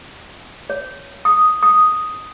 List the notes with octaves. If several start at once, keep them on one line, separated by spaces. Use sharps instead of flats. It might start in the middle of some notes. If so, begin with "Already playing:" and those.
C#5
D#6
D#6